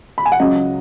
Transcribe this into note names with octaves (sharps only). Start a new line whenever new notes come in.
B5
G#5
F#5
C#2 C#3 F#3 D#5